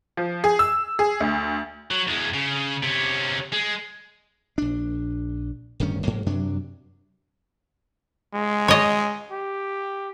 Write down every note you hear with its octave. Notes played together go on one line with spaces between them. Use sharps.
F3
G#4
E6
G#4
D2
F#3
E2 G#3
C#3
C3 C#4
G#3
A#1 D4
D1 G2 D#3 C#4
G#2 F#3 A#3
F#2 C3 F#3 D4
G#3
C#5 D#5
G4